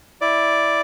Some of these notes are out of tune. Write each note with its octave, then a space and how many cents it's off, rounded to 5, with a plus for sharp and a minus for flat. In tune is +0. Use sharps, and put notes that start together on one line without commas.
E4 +0 D5 +0